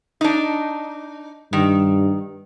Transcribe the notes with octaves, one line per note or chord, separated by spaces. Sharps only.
D4 D#4
G2 D#3